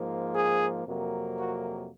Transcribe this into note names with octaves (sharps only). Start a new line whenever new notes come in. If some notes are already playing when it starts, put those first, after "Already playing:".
Already playing: G#2 F3 A#3
G#4
F2 C3 F#3 A#3
F#4